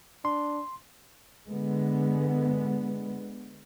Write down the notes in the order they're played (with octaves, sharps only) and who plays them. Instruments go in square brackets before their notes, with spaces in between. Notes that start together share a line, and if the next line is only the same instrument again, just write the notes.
[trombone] D4 [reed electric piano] C6
[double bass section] D3 G#3 B3